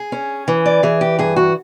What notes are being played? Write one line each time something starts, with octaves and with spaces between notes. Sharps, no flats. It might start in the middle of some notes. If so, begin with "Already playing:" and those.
Already playing: G#4
C#4
E3
D5
E3 G#4
G4
G2 G#4
F#4